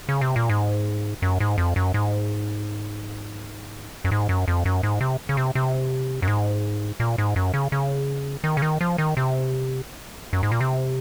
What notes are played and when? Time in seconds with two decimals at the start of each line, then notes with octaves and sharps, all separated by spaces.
0.09 C#3
0.21 C3
0.36 A#2
0.49 G#2
1.22 F#2
1.40 G#2
1.58 F2
1.76 F#2
1.94 G#2
4.05 F#2
4.12 G#2
4.29 F#2
4.48 F2
4.65 F#2
4.83 G#2
5.01 C3
5.29 C#3
5.37 C3
5.55 C3
6.22 F#2
6.28 G#2
7.00 A#2
7.18 G#2
7.36 F#2
7.54 C#3
7.72 C#3
8.44 D#3
8.57 C#3
8.62 D#3
8.81 F3
8.98 D#3
9.17 C3
10.33 F#2
10.43 G#2
10.52 A#2
10.61 C3